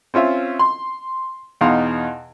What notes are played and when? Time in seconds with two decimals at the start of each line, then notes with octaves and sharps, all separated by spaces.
0.14 C4 C#4 F4 E5
0.59 C6
1.61 E2 B2 D#4 F5 C6